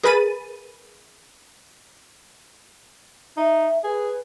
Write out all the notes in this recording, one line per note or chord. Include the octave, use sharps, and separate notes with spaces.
G#4 A#4 B4 B5 A6 D#7
D#4 E5
G#4 B4